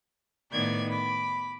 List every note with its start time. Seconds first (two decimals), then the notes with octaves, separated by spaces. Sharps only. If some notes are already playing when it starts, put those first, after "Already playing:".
0.52 A2 D#3 B3 D5 G#6
0.89 B5 D6